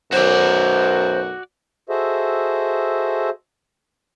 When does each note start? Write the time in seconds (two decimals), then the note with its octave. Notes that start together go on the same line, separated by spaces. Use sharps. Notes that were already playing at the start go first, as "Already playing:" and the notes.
0.12 B1 F#2 F#4 A#4 C5 D5
1.89 F#4 G#4 A4 C5 D#5 E5